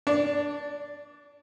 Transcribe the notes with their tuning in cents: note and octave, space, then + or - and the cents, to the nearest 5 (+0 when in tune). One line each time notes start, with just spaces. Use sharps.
D4 +0 D5 -35